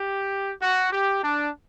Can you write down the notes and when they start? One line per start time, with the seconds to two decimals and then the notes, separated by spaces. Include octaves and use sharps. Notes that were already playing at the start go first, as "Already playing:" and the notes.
Already playing: G4
0.60 F#4
0.91 G4
1.21 D4